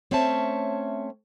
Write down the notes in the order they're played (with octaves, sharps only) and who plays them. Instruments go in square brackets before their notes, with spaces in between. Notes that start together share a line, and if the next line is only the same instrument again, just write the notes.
[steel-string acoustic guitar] A3 C4 C#4 C#5 E5 A5